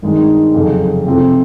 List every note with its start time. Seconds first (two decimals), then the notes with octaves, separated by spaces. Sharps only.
0.02 G#1 G2 D#3 G#3
0.54 F1 F2 C#3 F#3
1.06 C3 F3 A3 C4 F4